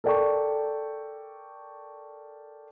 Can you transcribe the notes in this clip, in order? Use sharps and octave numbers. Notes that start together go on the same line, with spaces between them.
A4 A#4 D5 G5 A5 C#6